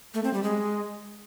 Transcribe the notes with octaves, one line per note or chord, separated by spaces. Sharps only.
A3
C4
G3
G#3